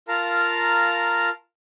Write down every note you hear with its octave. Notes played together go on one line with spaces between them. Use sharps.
F4 A#4 F5 A5 A#5